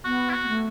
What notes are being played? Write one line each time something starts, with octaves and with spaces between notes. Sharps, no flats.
B3 F#4
E4
F#4
B3
A3